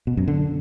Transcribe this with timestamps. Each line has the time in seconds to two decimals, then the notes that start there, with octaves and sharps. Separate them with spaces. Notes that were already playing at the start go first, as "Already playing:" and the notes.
0.07 B2
0.17 F#2
0.28 D3